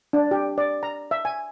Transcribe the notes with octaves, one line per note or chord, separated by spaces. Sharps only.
D4
G4
D5
A#5
E5
G#5